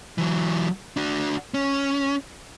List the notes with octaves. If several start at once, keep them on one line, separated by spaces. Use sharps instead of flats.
E3 F#3
D4 F#4
C#4